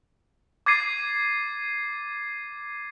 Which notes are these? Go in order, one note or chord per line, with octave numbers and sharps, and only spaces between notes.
D6 G#6 A6 C7 D#7